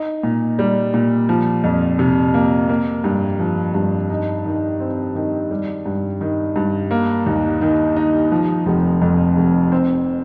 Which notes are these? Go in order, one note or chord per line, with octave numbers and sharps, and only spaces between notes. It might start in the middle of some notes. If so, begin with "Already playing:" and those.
Already playing: D#4
A#2
G3
A#2
F3
F2
C3
A#3
A#3
G2
F3
G2
D#4
D#3
C4
D#3
G3
G2
D#3
G2
A#3
D#2
D#3
D#4
F3
F1
F2
F1
C4